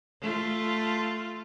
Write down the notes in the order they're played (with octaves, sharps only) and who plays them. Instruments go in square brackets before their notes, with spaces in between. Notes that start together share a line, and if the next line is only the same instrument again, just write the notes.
[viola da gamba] A3 F4 A4